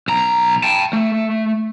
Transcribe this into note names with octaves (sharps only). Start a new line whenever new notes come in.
B1 A#5
G5 A5
A3